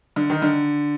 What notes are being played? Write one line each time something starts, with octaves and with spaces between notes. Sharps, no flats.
D3
D#3
D3